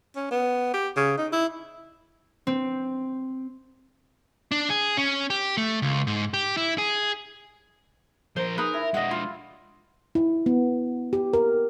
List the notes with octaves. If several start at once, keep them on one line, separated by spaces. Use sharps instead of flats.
C#4
B3
G4
C#3
D#4
E4
C4
D4
G#4
C#4
G4
A3
C#2
G#2
G4
E4
G#4
F3 A#4 C5
D#4 G#4 A#4 B4
E4
G#3 D4 D#5 F#5
F4
E4
B3
G4
A#4